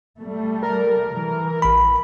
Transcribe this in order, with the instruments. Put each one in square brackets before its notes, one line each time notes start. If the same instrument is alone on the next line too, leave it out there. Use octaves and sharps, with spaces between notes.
[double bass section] G3 A3
[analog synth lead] A#4
[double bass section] E3
[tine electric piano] A1 B5